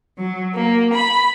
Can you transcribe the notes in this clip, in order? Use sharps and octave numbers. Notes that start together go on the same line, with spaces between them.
F#3
A#3
B5